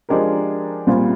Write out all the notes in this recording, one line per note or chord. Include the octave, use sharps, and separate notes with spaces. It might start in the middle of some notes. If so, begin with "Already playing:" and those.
F3 G#3 D4 G4 A#4
C2 A#2 G3 C4 F4